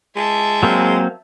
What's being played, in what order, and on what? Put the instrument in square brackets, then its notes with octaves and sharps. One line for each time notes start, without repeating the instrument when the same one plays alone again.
[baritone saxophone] G#3 [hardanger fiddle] E5 A5
[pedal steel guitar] F#3 A#3 C4